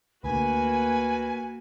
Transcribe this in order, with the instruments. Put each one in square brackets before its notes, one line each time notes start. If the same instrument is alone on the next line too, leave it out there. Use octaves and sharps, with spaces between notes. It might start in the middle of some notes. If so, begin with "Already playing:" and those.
[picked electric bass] D2 D3 [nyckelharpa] A#3 F#4 [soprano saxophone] B4 [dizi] G#5